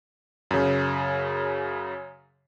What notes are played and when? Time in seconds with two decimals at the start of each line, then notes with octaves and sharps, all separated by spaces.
0.51 F#2 C#3